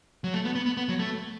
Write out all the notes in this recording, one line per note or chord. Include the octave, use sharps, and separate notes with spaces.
F#3
A3
B3
B3
B3
B3
F#3
A3